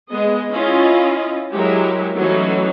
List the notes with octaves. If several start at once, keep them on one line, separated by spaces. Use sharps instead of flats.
G#3 B3 G#4 D#5
C#4 E4 F4 D#5
F#3 G#3 E4 G4 A#4
E3 F#3 A3 C#4 D#4 F#4